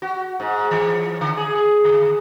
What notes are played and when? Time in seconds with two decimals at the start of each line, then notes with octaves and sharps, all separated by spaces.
0.02 F#4
0.40 G#2
0.71 E3
1.21 D3
1.37 G#4
1.55 G#4
1.85 D3